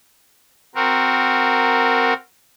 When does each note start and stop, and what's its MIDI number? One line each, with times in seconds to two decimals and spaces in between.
0.75 2.13 60
0.75 2.13 66
0.75 2.13 70